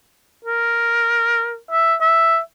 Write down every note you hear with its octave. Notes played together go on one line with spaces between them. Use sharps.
A#4
E5
E5